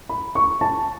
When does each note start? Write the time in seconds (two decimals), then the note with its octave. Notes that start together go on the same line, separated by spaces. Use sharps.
0.09 B5
0.35 C#6
0.61 A5